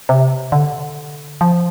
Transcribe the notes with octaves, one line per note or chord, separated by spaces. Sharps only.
C3
D3
F3